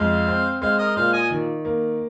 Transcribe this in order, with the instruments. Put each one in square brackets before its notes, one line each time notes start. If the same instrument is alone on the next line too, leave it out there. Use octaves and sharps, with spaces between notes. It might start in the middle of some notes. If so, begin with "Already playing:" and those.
Already playing: [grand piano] F2 G#3 [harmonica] C5 F5
[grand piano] C4
[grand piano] G#3 [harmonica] C5 F5
[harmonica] A#4 D#5
[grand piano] A#2 [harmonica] C5 F5
[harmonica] D#5 G#5
[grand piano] D#3
A#3